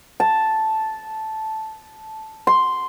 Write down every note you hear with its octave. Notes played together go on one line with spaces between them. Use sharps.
A5
C6